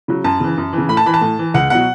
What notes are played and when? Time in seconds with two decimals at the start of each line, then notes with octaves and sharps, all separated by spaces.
0.08 C#3 F#3
0.24 F#2 A5
0.40 C#3 E3
0.58 F#2
0.73 C#3 E3
0.89 A2 B5
0.97 A5
1.06 E3 B5
1.14 A5
1.21 A2
1.39 E3
1.54 C#2 F#5
1.70 B2 F#3 F#5